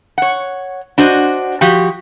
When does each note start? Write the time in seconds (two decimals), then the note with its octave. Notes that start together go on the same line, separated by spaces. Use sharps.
0.18 C#5 F#5
0.98 D4 F#4 C5 D#5
1.61 F3 F#4 G4